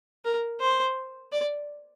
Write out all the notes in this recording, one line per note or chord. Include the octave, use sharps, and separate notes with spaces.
A#4
C5
D5